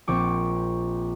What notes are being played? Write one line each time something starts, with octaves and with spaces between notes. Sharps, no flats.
A#1 C4 C#6 D6